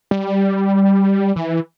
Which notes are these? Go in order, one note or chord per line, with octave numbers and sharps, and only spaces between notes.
G3
E3